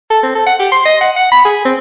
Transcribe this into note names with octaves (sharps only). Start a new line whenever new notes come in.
A4
C4
A4
F#5
G4
C6
D#5
F#5
F#5
B5
G#4
C4